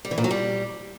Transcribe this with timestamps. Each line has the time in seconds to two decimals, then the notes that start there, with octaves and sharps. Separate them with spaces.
0.05 G3
0.11 E3
0.18 A#2
0.24 F#3
0.31 G3